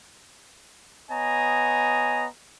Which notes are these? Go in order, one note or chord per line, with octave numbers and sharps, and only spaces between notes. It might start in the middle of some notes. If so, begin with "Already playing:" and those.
B3 C#5 D#5 G#5 A#5